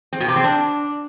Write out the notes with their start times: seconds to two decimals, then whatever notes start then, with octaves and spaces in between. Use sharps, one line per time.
0.13 C4
0.20 B2
0.28 C3
0.36 C4
0.44 D4